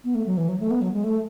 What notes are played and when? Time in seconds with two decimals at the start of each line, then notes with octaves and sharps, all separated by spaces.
0.04 B3
0.15 A3
0.26 F#3
0.37 E3
0.49 F#3
0.60 A3
0.71 B3
0.81 F#3
0.93 G#3
1.04 A3